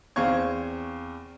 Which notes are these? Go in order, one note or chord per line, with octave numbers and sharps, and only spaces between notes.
E2 C4 F5 C#6 G#6